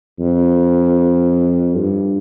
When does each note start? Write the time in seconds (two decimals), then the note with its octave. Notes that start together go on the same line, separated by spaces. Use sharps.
0.19 F2
1.77 G2